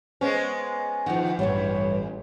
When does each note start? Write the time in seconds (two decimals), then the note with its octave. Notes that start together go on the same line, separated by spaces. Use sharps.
0.21 G#3 B3 C#4 C5
1.06 E2 D#3 F3 F#5
1.39 A1 G2 E3 G3 C#5